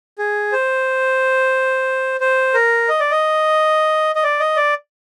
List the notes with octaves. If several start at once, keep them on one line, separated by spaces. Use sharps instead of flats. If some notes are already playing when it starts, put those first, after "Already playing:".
G#4
C5
C5
A#4
D#5
D5
D#5
D#5
D5
D#5
D5